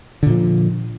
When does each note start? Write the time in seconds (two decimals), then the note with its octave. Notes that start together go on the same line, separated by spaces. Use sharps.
0.23 D3
0.26 A#2
0.30 F3